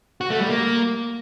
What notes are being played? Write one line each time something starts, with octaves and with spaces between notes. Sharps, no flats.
F#4
A3
G3
A#3